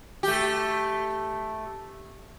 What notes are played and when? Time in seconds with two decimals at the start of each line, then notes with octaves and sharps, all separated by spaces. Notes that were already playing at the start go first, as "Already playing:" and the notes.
0.23 A3 G4